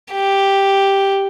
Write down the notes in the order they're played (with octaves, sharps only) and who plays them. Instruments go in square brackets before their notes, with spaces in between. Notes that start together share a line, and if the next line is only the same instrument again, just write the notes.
[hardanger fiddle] G4